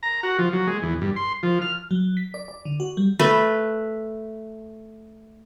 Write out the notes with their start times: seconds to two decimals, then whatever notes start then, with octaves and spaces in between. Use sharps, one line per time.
0.03 A#5
0.23 F#4
0.39 F3
0.53 F#3
0.67 G#3
0.82 E2
1.01 G2
1.16 C6
1.43 F3
1.62 F6
1.91 F#3
2.17 B6
2.34 D5
2.48 D5
2.65 D3
2.80 F#4
2.97 G3
3.19 A3 B4